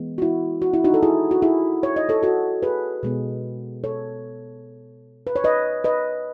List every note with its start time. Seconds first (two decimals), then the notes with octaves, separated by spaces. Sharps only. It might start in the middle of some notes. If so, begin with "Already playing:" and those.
Already playing: E3 G#3 B3
0.18 F#4
0.22 E4
0.62 F#4
0.74 E4
0.84 D#4 F#4
0.94 A4
1.03 E4 G#4
1.31 F#4
1.42 E4 G#4
1.83 C#5
1.96 D#5
2.09 A4 C#5
2.23 F#4 A4
2.63 G#4 B4
3.03 B2 G#3 B3
3.84 A4 C#5
5.27 B4
5.36 C#5
5.44 B4 D#5
5.84 B4 D#5